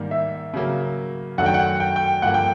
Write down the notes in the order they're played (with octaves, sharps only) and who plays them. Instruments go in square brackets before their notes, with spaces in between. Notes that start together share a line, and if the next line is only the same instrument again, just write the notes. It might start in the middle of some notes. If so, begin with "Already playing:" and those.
Already playing: [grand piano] G#2 D#3 G3 A#3
[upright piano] E5
[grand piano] C#3 F#3 A#3
[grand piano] F#2 D#3 F#3 A3 D4 [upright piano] F#5
[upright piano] G5
F#5
G5
G5
[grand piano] G2 D3 F3 A#3 [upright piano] F#5
[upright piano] G5